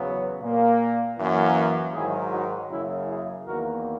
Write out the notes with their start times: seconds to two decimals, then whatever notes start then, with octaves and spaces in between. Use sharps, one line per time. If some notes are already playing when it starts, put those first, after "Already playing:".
Already playing: E2 C#3 F#3 B3
0.41 A#2 A#3
1.18 F#2 E3 A#3
1.94 G#2 D#3 F#3 E4 G#4
2.33 D#4 F#4
2.70 F#2 C#3 F#3 A#3 C#4 E4
3.08 E4 G#4
3.46 E2 D#3 A#3 F#4 A#4